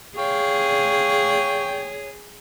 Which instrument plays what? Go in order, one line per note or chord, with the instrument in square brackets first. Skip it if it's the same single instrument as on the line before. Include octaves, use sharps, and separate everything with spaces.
[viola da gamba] G#4 [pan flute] C#5 [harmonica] F5 G5 C#6